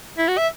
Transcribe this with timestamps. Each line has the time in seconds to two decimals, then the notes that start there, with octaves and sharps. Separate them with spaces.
0.18 E4
0.28 F#4
0.38 E5